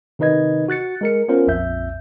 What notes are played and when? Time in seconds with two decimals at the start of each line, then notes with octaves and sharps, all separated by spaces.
0.19 C3 D#3 D#4 B4 D#5 G#6
0.68 F#4 F#6 A6 C#7
1.01 G#3 A#4 C#7
1.28 B3 C#4 F4 A#4 C5
1.47 A#1 F2 E5 G6